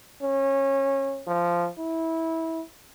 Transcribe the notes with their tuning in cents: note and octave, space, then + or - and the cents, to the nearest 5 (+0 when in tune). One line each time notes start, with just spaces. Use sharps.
C#4 -25
F3 -10
E4 -20